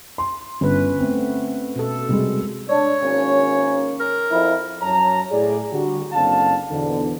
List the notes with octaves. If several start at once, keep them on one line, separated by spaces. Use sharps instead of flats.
C6
G1 C#4 B4
A3 B3 C4
B2 A4
C3 G3 G#3
D4 C#5
G#1 A#3 C#4
A#4
F2 E4
F#2 F#3 C#5 A5 A#5
A2 G#4 D5
D3 G3 F#4
F#1 D3 C4 F5 A5
E2 G#2 B2 D3